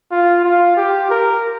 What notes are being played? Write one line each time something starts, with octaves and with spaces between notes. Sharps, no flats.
F4
F4
G4
A#4